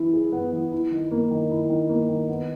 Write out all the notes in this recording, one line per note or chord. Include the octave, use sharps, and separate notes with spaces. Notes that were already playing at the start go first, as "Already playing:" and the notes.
Already playing: E3 E4
G#4
B3
E3
E4
D#3
A#3
D#3
E4
D#3
A#3
D#3
B3